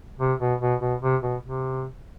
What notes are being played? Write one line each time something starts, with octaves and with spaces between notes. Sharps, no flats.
C3
B2
B2
B2
C3
B2
C3